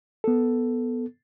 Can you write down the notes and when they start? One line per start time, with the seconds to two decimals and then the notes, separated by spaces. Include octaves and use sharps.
0.24 B3 A4